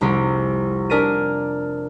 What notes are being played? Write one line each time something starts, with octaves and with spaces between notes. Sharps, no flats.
F1 C2 G4 G#4
D4 G#4 A#4 D5 B6 D#7